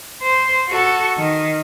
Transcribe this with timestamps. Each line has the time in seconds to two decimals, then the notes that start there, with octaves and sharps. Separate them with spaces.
0.23 C5
0.69 F#4 A4
1.18 D#3